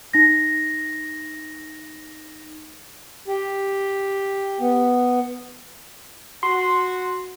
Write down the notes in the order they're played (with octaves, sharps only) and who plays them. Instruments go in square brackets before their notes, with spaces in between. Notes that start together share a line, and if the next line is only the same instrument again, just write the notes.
[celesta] D#4 A#6
[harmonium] G4
B3
[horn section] F#4 [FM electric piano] C6